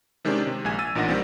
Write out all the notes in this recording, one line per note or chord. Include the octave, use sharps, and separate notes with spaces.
C3 D#3 G#3 C#4 D4 G4
C3
A#1 G#3 G#5 G#6
E6 A6 D#7
A1 A#2 D4 D#4 F#5 A#6
D#3 G3 A#3 C4